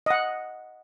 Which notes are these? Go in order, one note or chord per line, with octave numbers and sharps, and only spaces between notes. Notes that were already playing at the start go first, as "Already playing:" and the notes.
D#5 F#5